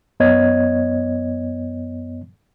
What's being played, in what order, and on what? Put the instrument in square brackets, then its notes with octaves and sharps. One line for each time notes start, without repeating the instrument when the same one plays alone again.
[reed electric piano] F#2 B3 C#5 D#5 G#6